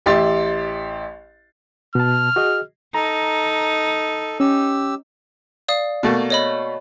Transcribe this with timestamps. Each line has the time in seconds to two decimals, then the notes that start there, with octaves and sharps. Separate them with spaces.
0.06 A1 G4 E5 C6 A6
1.95 B2 A5 F6
2.36 F#4 G#4 D#5
2.94 D#4 A4 A#5
4.40 C#4 G4 E6
5.69 D5 F5 D#6
6.03 B2 A3 A#3
6.30 C#5 D#5 B5